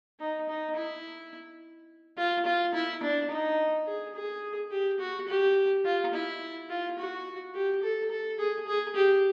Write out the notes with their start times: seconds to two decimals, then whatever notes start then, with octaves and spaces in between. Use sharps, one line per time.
0.20 D#4
0.49 D#4
0.76 E4
2.18 F4
2.45 F4
2.74 E4
3.03 D4
3.30 D#4
3.87 G#4
4.15 G#4
4.72 G4
5.00 F#4
5.28 G4
5.85 F4
6.14 E4
6.70 F4
6.98 F#4
7.55 G4
7.83 A4
8.11 A4
8.39 G#4
8.68 G#4
8.96 G4